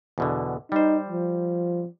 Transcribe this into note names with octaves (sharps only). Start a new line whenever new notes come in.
E2 B2 D3
G3 D#4 C5
F3